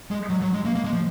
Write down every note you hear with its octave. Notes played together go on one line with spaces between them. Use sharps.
G#3
F#3
F#3
G#3
A#3
A#3
G#3
F3